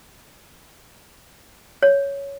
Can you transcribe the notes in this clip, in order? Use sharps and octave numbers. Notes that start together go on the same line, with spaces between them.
C#5